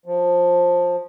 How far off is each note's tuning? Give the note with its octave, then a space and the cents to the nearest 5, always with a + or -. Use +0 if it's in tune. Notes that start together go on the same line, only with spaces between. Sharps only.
F3 +15